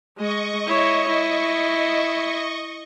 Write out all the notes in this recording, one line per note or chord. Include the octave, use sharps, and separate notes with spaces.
G#3 D#5 C#6
E4 C#5
E4